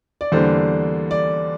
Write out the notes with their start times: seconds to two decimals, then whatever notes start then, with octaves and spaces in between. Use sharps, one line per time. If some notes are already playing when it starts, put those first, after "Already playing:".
0.21 D5
0.32 E2 D3 G3 A#3 D4 C5
1.11 D5